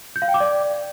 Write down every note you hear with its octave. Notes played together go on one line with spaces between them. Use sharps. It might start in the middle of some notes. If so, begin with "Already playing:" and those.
G6
F5
G5
D6
D5